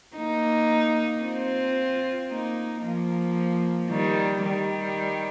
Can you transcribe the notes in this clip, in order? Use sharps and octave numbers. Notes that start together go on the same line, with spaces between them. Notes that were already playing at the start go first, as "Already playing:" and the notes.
A#3 D#4
C4 F4
A#3 D#4
F3 A#3
D#3 G3
D#3 G3